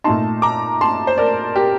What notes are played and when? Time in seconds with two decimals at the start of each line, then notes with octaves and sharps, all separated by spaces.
0.04 A#2 A3 D#4 A5 C6
0.42 A#5 D6
0.81 A5 C6
1.07 C5
1.18 A#4 D5
1.56 G4 A#4